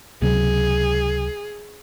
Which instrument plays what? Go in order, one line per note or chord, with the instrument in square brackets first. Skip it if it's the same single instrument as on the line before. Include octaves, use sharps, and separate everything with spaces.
[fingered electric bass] C#2 C3 F#3 [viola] G#4